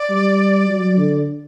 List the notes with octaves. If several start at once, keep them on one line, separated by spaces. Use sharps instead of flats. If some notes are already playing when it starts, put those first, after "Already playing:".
Already playing: D5
G3
F#3
D3